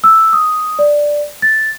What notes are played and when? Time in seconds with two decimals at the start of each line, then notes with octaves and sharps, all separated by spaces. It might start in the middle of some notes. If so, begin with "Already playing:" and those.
0.04 E6
0.33 D#6
0.79 D5
1.42 A6